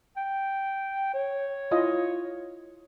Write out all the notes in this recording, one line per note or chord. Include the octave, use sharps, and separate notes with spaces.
G5
C#5
E4 F4 D#5